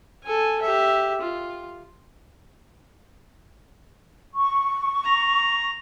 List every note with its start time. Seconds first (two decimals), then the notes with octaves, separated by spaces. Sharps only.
0.24 A4 G#5
0.62 G4 E5
1.21 F4
4.34 C#6
5.04 A#5